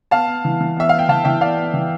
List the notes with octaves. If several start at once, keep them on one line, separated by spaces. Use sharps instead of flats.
B3 F5 A5
B3
E3
E3
B3 E5
B3 F5
G5
E3 F5 A5
E3 E5 G5
B3 D5 F5
B3
E3